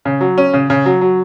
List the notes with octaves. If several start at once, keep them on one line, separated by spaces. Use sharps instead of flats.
C#3
F#3
C#4
C#3
C#3
F#3
F#3